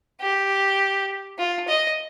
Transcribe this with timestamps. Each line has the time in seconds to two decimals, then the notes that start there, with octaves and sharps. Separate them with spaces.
0.21 G4
1.38 F4
1.68 D#5